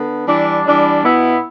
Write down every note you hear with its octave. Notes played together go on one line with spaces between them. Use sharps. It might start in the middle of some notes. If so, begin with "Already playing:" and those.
Already playing: D3 B3
E3 G3 D4
E3 G3 D4
B2 B3 E4